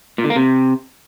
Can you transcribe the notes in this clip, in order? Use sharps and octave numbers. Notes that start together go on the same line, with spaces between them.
A#2
D3
A#3
C3